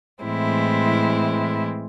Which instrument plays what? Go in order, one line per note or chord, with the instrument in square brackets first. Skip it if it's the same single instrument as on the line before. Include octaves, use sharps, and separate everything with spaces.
[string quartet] A2 E3 G#3 C4 E4